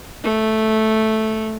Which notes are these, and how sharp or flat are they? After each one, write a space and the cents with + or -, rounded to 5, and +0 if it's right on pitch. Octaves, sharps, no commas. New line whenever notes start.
A3 -5